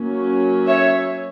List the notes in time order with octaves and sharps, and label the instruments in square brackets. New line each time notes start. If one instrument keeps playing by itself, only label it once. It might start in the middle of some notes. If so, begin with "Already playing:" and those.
Already playing: [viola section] F#3 A#3 C#4
C#5 E5